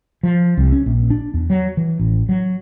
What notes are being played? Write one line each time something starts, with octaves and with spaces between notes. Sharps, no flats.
F3
C2
C#4
A#1
D4
E2
F#3
E3
A1
F#3